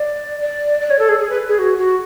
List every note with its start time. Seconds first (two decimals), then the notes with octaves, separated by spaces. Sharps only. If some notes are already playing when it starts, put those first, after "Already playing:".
Already playing: D5
0.41 D5
0.81 D5
0.90 C#5
0.99 A4
1.09 G#4
1.19 G#4
1.30 B4
1.48 G#4
1.59 F#4
1.78 F#4